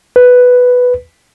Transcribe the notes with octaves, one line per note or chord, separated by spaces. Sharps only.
B4